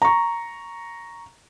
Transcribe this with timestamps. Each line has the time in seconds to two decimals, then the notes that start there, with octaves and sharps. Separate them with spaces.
0.02 A#5 C#6